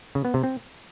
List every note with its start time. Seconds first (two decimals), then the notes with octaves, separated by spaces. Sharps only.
0.15 C#3
0.25 B3
0.34 C3
0.43 C4